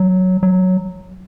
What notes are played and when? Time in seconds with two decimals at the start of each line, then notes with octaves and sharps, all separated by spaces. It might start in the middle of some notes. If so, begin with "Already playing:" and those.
Already playing: F#3
0.43 F#3